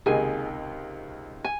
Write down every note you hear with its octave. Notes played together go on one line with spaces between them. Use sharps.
C#2 C3 D#3 A#3 D#4 G#4 G#5
G#5